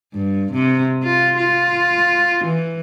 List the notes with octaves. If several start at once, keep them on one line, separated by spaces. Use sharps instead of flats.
G2
C3
F4
F4
E3